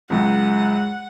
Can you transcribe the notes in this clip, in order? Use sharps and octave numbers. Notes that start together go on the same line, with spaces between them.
C#2 F#2 G#3 F#5